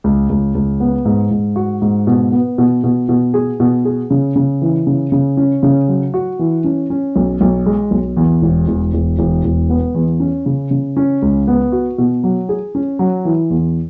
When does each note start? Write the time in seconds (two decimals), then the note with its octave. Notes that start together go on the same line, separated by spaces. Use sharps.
0.04 C#2
0.29 C#2
0.55 C#2
0.80 B3
1.05 G#2
1.31 G#2
1.56 F#4
1.82 G#2
2.07 B2
2.32 B3
2.58 B2
2.84 B2
3.09 B2
3.34 G#4
3.60 B2
3.85 G#4
4.10 C#3
4.36 C#3
4.62 E3
4.87 C#3
5.12 C#3
5.37 C#4
5.63 C#3
5.88 F#3
6.14 F#4
6.39 E3
6.64 C#4
6.90 C#4
7.16 B1
7.41 B1
7.66 G#3
7.91 B1
8.17 E2
8.42 E1
8.68 E1
8.94 E1
9.19 E1
9.44 E1
9.70 B3
9.95 E2
10.20 C#4
10.46 C#3
10.71 C#3
10.97 C#4
11.22 C#2
11.48 B3
11.72 F#4
11.98 B2
12.23 F#3
12.49 G#4
12.75 C#4
12.99 F#3
13.25 E3
13.50 E2